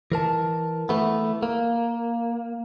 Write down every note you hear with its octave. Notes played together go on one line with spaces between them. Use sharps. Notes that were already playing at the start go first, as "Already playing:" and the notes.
E3 A#4 A5
E3 A3 B3
A#3